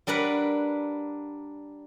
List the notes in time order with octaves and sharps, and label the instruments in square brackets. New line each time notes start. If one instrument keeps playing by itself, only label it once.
[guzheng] G3 D4 A#4 B4 F#5